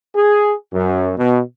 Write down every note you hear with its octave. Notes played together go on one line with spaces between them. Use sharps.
G#4
F#2
B2